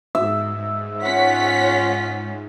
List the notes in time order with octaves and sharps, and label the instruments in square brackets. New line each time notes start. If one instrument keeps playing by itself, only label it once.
[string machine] G#2 [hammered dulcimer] E5
[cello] C#4 F4 [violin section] C#5 F#5 B6